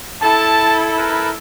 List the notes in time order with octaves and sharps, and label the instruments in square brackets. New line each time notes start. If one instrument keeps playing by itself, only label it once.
[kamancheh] E4 A4 [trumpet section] A5
[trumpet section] A#4 B4